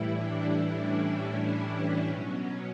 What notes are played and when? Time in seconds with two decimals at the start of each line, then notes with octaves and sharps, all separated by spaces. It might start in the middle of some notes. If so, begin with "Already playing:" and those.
Already playing: A2 E3 G3 E4
0.14 D4
0.78 C#4
1.42 C#4
2.07 B2 F#3